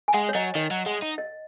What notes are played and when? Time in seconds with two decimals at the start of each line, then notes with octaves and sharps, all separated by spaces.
0.08 G#5
0.14 G#3 F#5
0.29 C#5
0.34 F#3 D#5
0.55 D#3 D#5
0.71 F#3
0.86 G#3 F#5
1.02 D#4
1.18 D#5